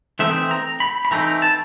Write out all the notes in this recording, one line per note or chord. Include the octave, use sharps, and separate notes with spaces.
E3 A3 C4 D#4 E5
A#5
B5
B5
E3 A3 C4 D#4 A#5
A5